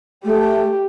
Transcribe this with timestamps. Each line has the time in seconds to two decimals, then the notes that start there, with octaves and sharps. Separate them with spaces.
0.24 A3 G4